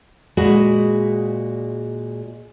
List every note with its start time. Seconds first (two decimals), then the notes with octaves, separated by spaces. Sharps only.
0.37 A#2 G#3 F#4 G#4 B4 F#5